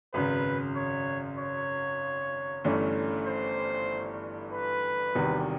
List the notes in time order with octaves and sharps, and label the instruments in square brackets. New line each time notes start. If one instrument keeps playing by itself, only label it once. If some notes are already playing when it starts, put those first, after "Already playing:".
[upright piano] G#1 F#2 C#3 [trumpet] B4
[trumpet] C#5
C#5
[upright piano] G1 G2 E3 A3 C#4
[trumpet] C5
B4
[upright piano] E1 E2 C3 D#3 G3